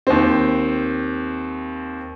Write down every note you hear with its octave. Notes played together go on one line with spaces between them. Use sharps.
D#2 C4